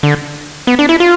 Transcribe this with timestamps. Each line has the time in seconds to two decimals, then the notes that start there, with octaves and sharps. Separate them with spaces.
0.03 D3
0.67 B3
0.79 D4
0.89 E4
1.00 F4